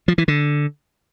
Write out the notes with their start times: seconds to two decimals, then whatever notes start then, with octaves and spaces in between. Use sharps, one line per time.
0.08 F3
0.18 E3
0.28 D3